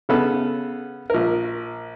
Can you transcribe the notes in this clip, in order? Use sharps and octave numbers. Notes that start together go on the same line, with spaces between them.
C#3 B3 A4
A#1 A#4